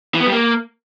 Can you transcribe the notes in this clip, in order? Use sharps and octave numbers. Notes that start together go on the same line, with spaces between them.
E3
B3
G3
A#3